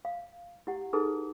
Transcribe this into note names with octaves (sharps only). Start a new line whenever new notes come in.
F5
E4 G4 F#5
D#4 E4 G#4 A4 B4